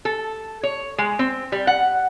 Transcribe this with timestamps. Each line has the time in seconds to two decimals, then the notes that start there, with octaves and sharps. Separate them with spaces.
0.05 A4
0.63 C#5
0.98 G#3
1.19 C4
1.52 G3
1.67 F#5